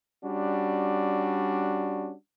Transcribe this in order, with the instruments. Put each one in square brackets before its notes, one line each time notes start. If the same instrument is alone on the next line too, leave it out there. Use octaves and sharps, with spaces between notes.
[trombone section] G3 C#4 D4 F#4